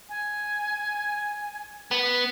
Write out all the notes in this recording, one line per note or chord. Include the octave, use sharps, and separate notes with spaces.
G#5
B3